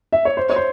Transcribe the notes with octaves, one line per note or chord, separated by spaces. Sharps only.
E5
C#5
C5
C#5
C5